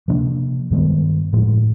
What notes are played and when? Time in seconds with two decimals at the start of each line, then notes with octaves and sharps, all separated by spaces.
0.08 C3 F3 A#3 D4
0.71 G2 D#3 G#3 B3
1.33 A2 F3 G#3